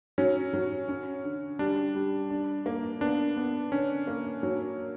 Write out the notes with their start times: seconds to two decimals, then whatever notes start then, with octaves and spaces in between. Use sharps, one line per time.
0.18 F#3 C#4
0.53 F#3
0.89 C#4
1.24 D3
1.59 G3 D4
1.95 G3
2.30 D4
2.66 A#3
3.01 B3 D4
3.37 B3
3.72 D3 C#4
4.07 A#3
4.43 F#3